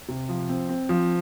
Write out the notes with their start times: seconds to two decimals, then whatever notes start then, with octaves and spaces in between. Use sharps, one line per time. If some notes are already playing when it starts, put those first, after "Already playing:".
0.08 C3
0.29 F3
0.49 C4
0.69 C4
0.89 F3